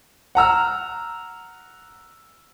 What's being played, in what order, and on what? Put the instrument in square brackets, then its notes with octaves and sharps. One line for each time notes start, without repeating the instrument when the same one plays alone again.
[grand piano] F#5 A#5 E6 F6